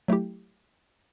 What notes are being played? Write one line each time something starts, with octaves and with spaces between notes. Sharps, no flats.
F#3 A3 E4 G4